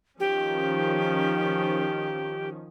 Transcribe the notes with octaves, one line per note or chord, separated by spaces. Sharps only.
D#3 F3 C#4 G4